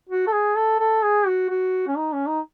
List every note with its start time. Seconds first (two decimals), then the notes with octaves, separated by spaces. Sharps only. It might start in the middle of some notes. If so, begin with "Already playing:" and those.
0.09 F#4
0.27 A4
0.32 G#4
0.56 A4
0.80 A4
1.03 G#4
1.27 F#4
1.50 F#4
1.87 C#4
1.97 D#4
2.13 C#4
2.28 D#4